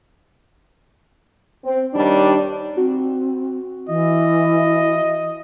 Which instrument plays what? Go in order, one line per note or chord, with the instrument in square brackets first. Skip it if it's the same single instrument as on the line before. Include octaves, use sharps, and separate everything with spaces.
[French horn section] C4
D#2 G3 D4 D#4
[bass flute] C4 [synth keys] F#4
[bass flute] E3 [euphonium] E4 [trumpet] D#5